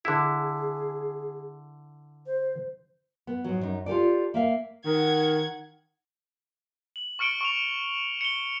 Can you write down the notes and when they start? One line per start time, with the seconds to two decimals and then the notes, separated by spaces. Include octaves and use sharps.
0.05 D3 E4 G#4
2.26 C5
3.27 B3
3.44 G#2 F#3
3.61 F#2 D#4
3.86 F4 G4 A4 D5
4.34 A#3 E5 F5
4.85 D#3 F#5 G#6
6.96 F#7
7.19 C#6 F6 C#7 D7 G7
7.41 C#6 F7
8.21 C#7 G7